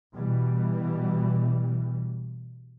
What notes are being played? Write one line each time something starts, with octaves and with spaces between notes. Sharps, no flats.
B2 E3 G3